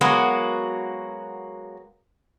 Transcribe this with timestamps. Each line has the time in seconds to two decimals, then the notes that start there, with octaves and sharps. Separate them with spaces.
0.01 F#3 G#3 A#3 B3 F#4